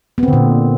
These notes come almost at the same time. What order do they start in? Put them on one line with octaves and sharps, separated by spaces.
B3 C4 D3 A#2